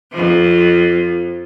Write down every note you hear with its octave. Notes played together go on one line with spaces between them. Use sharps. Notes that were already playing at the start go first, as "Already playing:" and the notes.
F2 F3